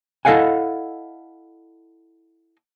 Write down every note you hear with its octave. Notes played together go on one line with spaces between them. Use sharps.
E4 A4 D#5 F5 F#5 G#5